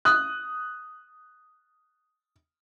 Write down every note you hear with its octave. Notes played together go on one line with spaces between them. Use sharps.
D#6 F#6